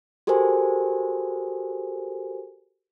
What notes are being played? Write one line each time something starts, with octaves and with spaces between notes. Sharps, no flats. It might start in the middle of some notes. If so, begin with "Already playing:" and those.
F#4 G4 A4 A#4 C5 G#5